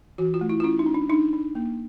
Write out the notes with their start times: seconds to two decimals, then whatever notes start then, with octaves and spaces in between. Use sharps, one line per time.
0.18 E3 F#4
0.34 F4
0.41 A3
0.49 E4
0.60 F4
0.63 C#4 E4
0.79 D#4
0.86 C#4
0.94 D4
1.09 D4 D#4
1.33 D4
1.55 A#3